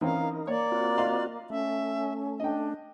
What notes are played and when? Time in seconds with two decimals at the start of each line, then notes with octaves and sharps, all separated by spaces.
0.01 E3 C4 C#4 D#4 A#4 F5 A#5
0.47 A#3 C#5 D5
0.72 C4 F4 F#4
0.98 D#5 F5 C6
1.50 A3 C#4 E5
2.40 D4 D#5 G5